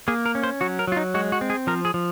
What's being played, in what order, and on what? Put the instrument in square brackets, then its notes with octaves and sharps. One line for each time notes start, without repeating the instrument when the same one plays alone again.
[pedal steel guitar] A#3 G#4
A#4
C#4
C5
F#3 F#4
A#4
F#3 F4
D#4
G#3 F#4
F#4
C4
G#4
F3 A#4
G#4
F3